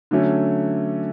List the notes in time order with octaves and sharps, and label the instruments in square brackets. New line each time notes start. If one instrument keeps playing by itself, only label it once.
[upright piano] D3 F#3 A3 C#4